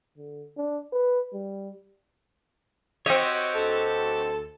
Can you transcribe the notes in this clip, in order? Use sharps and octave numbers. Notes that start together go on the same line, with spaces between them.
D3
D4
B4
G3
C4 F#4 G4 C#5 D#5
D2 A4